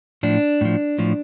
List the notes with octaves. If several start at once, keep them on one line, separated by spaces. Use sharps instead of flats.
A2 F3 D4
A2 F3
A2 F3